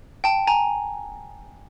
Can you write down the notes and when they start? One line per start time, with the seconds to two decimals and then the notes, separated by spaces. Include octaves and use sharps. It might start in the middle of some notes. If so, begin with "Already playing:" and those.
0.24 G5 A5
0.47 G#5 A#5